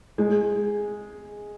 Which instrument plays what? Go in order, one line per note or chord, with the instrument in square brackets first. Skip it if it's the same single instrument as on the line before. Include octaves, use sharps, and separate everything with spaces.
[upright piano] G#3